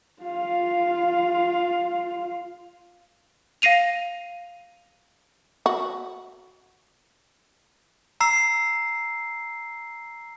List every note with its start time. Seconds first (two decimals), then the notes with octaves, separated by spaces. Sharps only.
0.22 F4 F5
3.62 F5 A#6 C7 D#7 F7
5.66 F#4
8.21 A#5 E6 C7